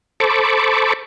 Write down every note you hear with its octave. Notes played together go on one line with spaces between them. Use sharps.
A4 C5 A5 B5 C#6 D6